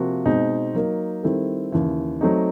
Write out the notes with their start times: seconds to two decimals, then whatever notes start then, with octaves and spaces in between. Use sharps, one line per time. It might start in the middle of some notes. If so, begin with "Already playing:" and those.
Already playing: C3 F3 A#3 F#4
0.25 B2 G#3 C4 D#4
0.75 F#3 A#3 D#4
1.23 D#3 G3 C4 E4 A4
1.72 D#2 C#3 E3
2.21 F#3 A3 C4 D#4